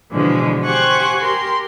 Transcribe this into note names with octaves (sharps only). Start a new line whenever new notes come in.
B2 D3 E3 F3 G#3
G4 C5 F#5 G#5 C#6 F#6
G4 A#4 C6